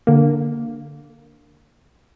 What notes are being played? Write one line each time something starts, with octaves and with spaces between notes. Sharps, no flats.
D3 A#3